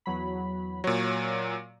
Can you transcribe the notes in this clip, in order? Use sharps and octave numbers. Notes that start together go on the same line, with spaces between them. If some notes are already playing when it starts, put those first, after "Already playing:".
E2 F#3 B5
A#2 F#3 C#5